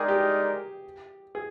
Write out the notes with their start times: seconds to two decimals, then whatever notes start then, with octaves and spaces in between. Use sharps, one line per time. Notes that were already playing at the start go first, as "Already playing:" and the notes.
Already playing: G#3 D#4 G#4 A#4 D5 G5
0.08 G4
1.35 G#4